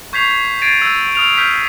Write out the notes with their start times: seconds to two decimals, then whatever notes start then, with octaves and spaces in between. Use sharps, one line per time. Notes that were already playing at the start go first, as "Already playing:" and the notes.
0.13 C#6 G6 G#6 B6 C7 F7
0.62 G#6 A6 C7 D7 D#7
0.82 E6 G6 D#7
1.15 D#6 F6 F7
1.37 F6 G6 B6